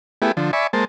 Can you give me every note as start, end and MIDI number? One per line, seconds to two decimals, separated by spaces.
0.22 0.32 57
0.22 0.32 59
0.22 0.32 64
0.22 0.32 67
0.22 0.32 68
0.37 0.51 50
0.37 0.51 53
0.53 0.67 74
0.53 0.67 76
0.53 0.67 80
0.53 0.67 83
0.53 0.67 85
0.73 0.85 56
0.73 0.85 58
0.73 0.85 72
0.73 0.85 81